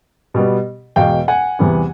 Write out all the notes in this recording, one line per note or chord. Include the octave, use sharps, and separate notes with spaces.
B2 G3 B3
E2 B2 G#3 F5 G5
F#5 G#5
E2 C3 E3 G3 B3